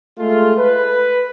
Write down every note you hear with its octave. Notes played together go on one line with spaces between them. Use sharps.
G#3 A3 F4
B4